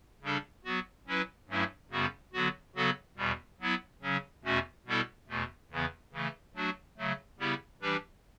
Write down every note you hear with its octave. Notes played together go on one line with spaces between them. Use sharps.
C#3 G3 D4 A4
F#3 B3 F#4
F#3 C#4 E4 B4
G2 F#3 A3 C#4 E4
F#2 C#3 G3 B3 F#4
D3 F#3 B3 F#4
C#3 F#3 B3 F#4 A4
E2 B2 G3
F#3 B3 E4
C#3 F#3 C#4
E2 B2 A3 C#4 F#4
B2 G3 B3 E4 A4
E2 B2 A3
E2 C#3 E3 B3
C#3 E3 A3
F#3 A3 D4 F#4
C#3 F#3 A3
C#3 G3 B3 E4 G4
E3 G3 D4 G4 B4